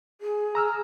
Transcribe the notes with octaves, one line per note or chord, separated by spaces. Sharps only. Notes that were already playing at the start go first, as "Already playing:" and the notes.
G#4
A#5 E6 F6